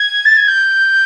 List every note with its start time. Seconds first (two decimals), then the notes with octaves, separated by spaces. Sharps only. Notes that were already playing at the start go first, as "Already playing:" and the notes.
Already playing: G#6
0.25 A6
0.36 G#6
0.47 G6